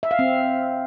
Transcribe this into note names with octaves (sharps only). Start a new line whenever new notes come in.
E5
F5
C4